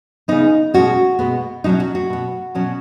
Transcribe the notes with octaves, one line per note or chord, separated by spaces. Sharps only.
C#3 B3 D#4
B2 G#3 C#4 F#4
B2 G#3 B3
B2 F#3 C#4 D#4
F#4
F#4
B2 B3
B2 F#3 C#4